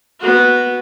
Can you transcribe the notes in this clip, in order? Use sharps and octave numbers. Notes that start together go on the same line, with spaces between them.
B3 F#4